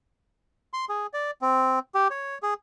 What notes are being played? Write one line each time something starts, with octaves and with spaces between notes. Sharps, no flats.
C6
G#4
D5
C4
G4
C#5
G#4